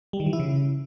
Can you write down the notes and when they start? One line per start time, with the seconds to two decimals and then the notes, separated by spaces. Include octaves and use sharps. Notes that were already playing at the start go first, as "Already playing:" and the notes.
0.13 G3
0.20 D#3
0.26 E3
0.33 E4
0.40 C#3